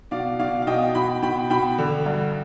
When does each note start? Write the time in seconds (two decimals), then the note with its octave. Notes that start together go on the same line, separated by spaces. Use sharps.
0.11 B2 D5 F5
0.39 B2 D5 F5
0.62 F5
0.67 B2 D#5 G5
0.95 B2 G5 B5
1.22 B2 G5 B5
1.50 B2 G5 B5
1.78 D3
2.06 G2